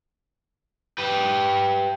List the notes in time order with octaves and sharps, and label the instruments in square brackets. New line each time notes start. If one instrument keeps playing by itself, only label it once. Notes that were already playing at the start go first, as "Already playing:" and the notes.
[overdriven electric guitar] G4 B4